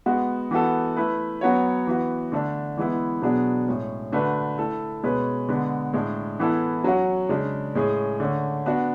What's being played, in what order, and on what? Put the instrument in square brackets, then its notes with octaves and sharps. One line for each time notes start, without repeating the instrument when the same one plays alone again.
[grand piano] G#3 B3 F#4
E3 B3 F#4 A4
A3 E4 B4
F#3 B3 F#4 C#5
E3 B3 F#4
D3 A3 D4
E3 G#3 B3 E4
B2 F#3 B3 D4 G#4
A2 G#3 C#4
D3 A3 D4 F#4 B4
A3 E4 A4
B2 G#3 C#4 G#4 B4
D3 G#3 B3
A2 G#3 D4
E3 B3 E4 A4
F#3 C#4 F#4
C#3 G#3 D4
A2 G#3 C#4 G#4
D3 A3 C#4
B3 D4 F#4